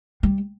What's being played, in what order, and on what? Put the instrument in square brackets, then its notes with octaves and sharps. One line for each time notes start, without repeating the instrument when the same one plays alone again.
[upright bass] G3